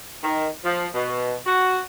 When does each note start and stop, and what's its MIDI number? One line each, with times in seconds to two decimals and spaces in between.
0.24 0.48 51
0.65 0.87 53
0.94 1.36 47
1.47 1.79 66